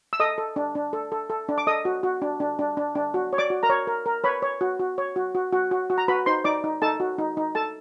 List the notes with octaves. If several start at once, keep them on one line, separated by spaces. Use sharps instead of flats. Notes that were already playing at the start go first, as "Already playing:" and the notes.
E6
A4 D#5 D#6
A4
D4
D4
A4
A4
A4
D4
D6
A4 D#5 D#6
F#4
F#4
D4
D4
D4
D4
D4
F#4
C#5
D5 D6
F#4
A#4 A#5
C#5
A#4
A#4
B4 C#5 B5
C#5
F#4
F#4
C#5
F#4
F#4
F#4
F#4
F#4
A#5
F#4 B4 B5
D#4 C5 C6
D#4 D5 D6
D#4
D#4 A4 A5
F#4
D#4
D#4
A4 A5